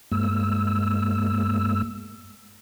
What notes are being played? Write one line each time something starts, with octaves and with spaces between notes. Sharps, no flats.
G2 G#3 A#3 E6